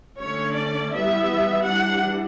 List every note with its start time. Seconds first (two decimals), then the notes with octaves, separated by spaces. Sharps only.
0.19 D3 A3 C#4 C#5
0.56 D5
0.93 E3 G3 B3 E5
1.65 E3 G3 D4 F#5